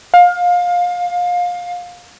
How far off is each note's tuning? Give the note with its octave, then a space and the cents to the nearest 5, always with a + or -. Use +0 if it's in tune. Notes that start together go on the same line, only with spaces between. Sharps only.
F5 +25